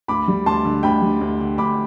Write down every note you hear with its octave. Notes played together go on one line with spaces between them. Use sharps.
D2 B5 D6
G3
D2 A5 C6
D3
D2 G5 B5
G3
D2
D3
D2 B5 D6